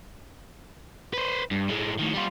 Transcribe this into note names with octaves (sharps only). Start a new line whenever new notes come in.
B4 C5
G2
A2 G#3
A2 D#3
G3 F4